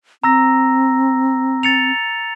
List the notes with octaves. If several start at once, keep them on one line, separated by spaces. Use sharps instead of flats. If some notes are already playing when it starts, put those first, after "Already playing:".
C4 A#5 E6 A#6
A6 C#7 F7